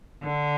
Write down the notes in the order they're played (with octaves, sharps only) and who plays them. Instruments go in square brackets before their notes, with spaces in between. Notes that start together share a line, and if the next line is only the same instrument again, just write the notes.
[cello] D3